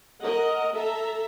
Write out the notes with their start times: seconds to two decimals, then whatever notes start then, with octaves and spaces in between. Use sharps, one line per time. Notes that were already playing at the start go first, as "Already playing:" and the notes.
0.22 A#4 D#5 F#5
0.75 A4 E5 A#5